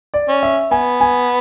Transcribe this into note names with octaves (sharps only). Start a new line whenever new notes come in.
D5
C#4
E5
B3 G#5
G#5